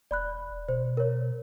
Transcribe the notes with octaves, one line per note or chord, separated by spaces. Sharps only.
E1 D5 B5 F#6
B2 C5
A#4 C#5